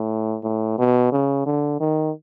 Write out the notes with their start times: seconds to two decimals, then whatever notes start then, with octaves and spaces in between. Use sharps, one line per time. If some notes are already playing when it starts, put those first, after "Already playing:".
Already playing: A2
0.43 A2
0.78 B2
1.12 C#3
1.46 D3
1.80 D#3